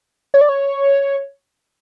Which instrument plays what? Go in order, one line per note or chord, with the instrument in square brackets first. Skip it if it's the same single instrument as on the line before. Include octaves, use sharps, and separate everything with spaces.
[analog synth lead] C#5
D5
C#5